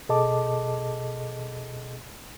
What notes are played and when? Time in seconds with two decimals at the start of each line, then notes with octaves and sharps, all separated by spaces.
0.09 B2 G#4 A4 D#5 A5 D6